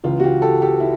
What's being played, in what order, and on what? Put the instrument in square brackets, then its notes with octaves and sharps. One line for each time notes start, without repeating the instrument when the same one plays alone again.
[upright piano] C#2 C#3 E3 F4
F#4
F4 G4
G4 A4
G4 A4
E4